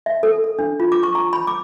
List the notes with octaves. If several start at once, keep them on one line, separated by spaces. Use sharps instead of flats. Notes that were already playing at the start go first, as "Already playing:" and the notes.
E5
A4
A4
D4
F4
D6
C#6
A#5
B5
D6